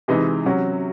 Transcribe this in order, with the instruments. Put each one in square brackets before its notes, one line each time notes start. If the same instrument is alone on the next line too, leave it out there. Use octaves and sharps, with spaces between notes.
[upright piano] C3 E3 G#3 D#4
C3 F#3 C#4 F#4